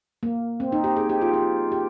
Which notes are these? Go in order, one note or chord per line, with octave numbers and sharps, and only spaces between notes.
A#3
C4
D#4
G4
G#4
G4
F4
G4
G4